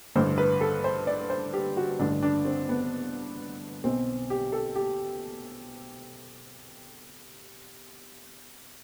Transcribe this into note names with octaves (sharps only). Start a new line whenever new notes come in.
A1 G2 D3 C5
B4
A4
C5
D5
C5
G4
F#4
A1 G2 D3 D4
D4
C4
B3
B1 B2 C4
G4
A4
G4